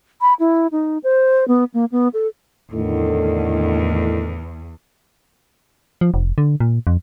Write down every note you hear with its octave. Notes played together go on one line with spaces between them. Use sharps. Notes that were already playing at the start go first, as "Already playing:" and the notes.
B5
E4
D#4
C5
B3
A#3
B3
A4
E2 A2 D3 D#3
F3
F1
D3
A#2
F2